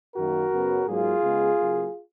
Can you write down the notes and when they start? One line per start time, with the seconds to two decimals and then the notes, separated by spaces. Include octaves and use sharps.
0.16 F#2 D#3 A#3 F#4 A#4
0.52 F#2 C#3 F#3 B3
0.87 G#2 F#3 A#3 F4 G#4
1.23 C#3 G#3 B3
1.58 C#3 F#3 A#3